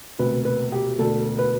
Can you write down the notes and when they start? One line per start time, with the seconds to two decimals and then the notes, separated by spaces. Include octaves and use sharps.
0.19 E1 D2 C3 B4
0.45 B4
0.72 G4
0.98 E1 D2 D3 A4
1.39 B4